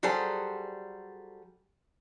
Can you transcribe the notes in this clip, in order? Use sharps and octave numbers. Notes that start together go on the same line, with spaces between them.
F#3 G3 G#4 A4 C5